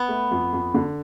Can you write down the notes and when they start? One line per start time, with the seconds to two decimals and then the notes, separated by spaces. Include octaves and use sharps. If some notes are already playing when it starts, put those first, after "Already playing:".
Already playing: B3
0.08 A3
0.31 F2
0.53 F2
0.74 D3